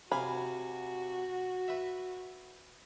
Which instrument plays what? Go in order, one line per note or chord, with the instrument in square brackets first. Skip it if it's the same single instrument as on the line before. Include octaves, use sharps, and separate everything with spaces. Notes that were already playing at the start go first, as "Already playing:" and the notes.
[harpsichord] C3 F5 G#5 [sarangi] F#4 [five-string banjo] B5
[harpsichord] B4 E5